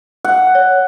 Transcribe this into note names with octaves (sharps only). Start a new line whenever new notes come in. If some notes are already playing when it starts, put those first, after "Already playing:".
F#5
C#5